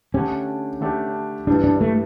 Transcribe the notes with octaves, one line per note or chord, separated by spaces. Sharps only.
D3 A3 C#4 D4 G4
D3 A3 D4 G4
G2 E3 G3 D4
D4
A3